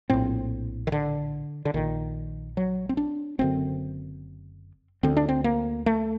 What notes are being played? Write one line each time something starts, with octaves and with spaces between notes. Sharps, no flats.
A#1 A2 C4
D#3
D3
D3
A#1 A#2 D#3
F#3
C4
D4
F#1 F#2 D3 C4
D2 D3 C4
D4
C4
A#3
A3